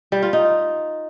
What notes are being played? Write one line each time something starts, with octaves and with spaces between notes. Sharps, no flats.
G3
F4
D#4